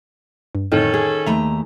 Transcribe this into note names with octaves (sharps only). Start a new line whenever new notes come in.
G2
F2 A2 D3 D#3 C#4 A4
G#4
D#2 A3 E5 A#5 B5